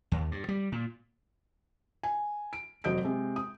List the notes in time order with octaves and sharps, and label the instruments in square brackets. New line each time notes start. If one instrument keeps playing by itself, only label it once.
[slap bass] D#2
G2
G3
A#2
[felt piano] G#5
D7
F1 F#3 D#5 G6 D7
C3 G#3
D#6